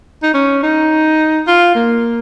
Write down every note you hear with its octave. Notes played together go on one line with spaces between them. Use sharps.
D#4
C#4
D#4
F4
A#3